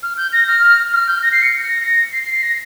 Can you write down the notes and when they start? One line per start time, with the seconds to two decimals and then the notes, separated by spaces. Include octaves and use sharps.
0.03 F6
0.17 G6
0.33 A#6
0.47 F6
0.93 F6
1.08 G6
1.22 A#6
1.32 C7
1.42 C#7
1.68 A#6
1.83 A#6
2.13 C7
2.23 C7
2.36 C7
2.43 A#6